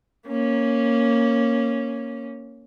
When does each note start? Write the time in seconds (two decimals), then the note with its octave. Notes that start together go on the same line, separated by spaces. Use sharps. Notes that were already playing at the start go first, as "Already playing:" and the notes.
0.27 A#3 C#4